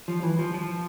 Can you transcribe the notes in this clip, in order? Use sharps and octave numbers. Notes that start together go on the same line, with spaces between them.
F3
E3
F3
F3